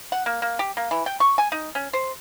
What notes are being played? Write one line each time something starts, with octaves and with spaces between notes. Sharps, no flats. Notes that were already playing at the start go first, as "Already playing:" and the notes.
F#5
A#3
A#3
G4
A#3
E3
G5
C#6
G#5
D#4
C#4
C5